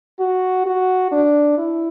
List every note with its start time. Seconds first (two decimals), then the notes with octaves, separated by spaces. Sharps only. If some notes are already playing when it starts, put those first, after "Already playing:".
0.20 F#4
0.66 F#4
1.12 D4
1.58 E4